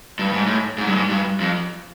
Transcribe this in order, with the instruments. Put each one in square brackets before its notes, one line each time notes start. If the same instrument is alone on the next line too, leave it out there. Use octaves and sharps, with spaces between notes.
[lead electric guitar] G2
G#2
A2
G#2
G2
G#2
G2
F2